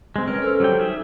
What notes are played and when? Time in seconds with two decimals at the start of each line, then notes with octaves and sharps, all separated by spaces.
0.16 G3 G#3 C4 C6
0.27 C#4 A#4 B4
0.42 A4 C5 E6
0.60 F#3 G3 G5
0.80 D#4 G#4 E5